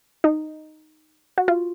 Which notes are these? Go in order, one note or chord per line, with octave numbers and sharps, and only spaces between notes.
D#4
F#4
F4